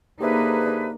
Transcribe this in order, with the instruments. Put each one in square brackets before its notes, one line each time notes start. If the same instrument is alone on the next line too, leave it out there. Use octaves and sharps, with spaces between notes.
[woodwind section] D3 G#4 B4 [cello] A#3 D#4 [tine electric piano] G4 C5 E5